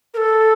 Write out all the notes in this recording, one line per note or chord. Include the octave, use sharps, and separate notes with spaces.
A#4
A4